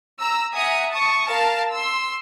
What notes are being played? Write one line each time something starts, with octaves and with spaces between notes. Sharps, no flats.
A#5 E6
E5 F#5 G#5 A#5 D#6
A5 C#6 D#6
A#4 F5 A5
C6 E6